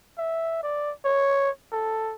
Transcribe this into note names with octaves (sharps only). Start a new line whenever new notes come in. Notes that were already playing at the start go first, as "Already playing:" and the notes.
E5
D5
C#5
A4